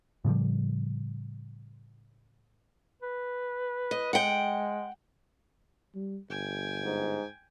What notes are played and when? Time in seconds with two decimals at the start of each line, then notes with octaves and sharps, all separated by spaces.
0.25 A2 C#3 F3 G3
3.02 B4
3.91 D#5
4.13 G#3 F#5 G5
5.95 G3
6.30 G1 G5 G#5
6.83 G#2